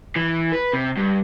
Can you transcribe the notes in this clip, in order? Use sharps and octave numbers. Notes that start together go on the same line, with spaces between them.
E3
B4
C3
G2